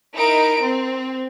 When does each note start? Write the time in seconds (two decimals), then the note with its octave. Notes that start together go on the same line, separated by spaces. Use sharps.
0.15 D#4 E4 A#4 D7
0.62 C4